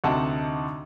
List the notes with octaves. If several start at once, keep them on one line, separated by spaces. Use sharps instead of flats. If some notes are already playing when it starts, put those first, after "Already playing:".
D2 C3 D#4 F#5 A5